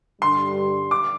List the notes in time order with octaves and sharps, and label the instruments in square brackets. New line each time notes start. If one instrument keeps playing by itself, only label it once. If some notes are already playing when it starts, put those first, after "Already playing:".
[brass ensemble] G2 D3 G3 [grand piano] C6
[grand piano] D6